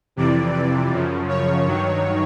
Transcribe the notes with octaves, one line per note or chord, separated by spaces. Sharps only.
F2 C3 E3 D5
D5
F#2 C#3 F3
C#5
G2 D#3 F#3